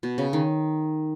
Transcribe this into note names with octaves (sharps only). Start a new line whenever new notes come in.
B2
C#3
D#3